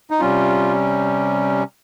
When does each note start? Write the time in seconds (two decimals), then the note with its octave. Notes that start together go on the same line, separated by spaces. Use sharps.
0.11 D#4
0.20 C3 G3 C#4 F4